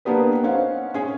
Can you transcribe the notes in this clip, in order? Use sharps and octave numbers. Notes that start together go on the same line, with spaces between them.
A#3 B3 D4 G4 B4
C4 C#4 D#4 F5 F#5
C#4 G#4